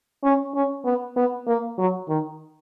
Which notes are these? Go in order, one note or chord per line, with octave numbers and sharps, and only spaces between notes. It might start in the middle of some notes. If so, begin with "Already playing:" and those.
C#4
C#4
B3
B3
A#3
F#3
D#3